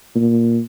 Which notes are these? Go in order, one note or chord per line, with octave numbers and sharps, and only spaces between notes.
A#2